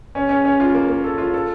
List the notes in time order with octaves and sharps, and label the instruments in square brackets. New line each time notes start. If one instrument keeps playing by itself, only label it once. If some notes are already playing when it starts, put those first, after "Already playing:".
[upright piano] C#4
C#4
C#4
F4
A#3
A#3
A4
F4
A4